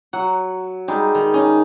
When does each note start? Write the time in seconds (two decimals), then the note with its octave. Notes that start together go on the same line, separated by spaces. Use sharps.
0.13 F#3 F#5
0.88 G3 G#3 D#4
1.15 D#3
1.34 C#4 D#4